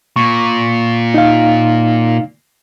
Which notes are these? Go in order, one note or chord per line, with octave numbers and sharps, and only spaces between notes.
A#2 C#6
D#4 F5